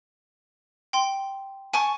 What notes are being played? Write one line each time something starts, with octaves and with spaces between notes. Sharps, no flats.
G5 C6
G#5 A5 C#6